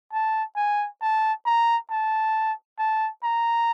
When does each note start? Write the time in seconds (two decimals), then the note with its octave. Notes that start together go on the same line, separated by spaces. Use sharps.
0.12 A5
0.56 G#5
1.02 A5
1.46 A#5
1.91 A5
2.78 A5
3.23 A#5